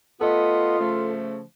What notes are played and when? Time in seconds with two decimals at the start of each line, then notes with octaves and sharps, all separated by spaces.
0.21 A3 B3 F4 A4 D#5
0.79 C#3 F3 A3